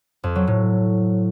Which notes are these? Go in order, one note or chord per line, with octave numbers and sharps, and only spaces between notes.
F2
F#3
A2